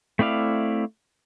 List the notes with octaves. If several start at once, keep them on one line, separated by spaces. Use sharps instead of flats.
A3 C4 E4 D5 F5